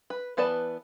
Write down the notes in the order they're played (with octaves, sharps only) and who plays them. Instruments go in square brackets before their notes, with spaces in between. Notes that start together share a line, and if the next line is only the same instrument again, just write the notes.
[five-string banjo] B4
E3 B3 B4 D5 A5